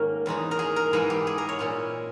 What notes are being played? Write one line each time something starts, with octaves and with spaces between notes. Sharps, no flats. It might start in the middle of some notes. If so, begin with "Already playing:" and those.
Already playing: G#2 D#3 A#3 C#4 A#4 C#5
E2 D#3 G#3 D#4
A#4
G#4
A#4
G#2 E3 G#3 D#4 G#4
G4
G#4
A#4
C#5
A#2 G#3 C#4 E4